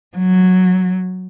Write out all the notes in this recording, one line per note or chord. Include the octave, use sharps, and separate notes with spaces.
F#3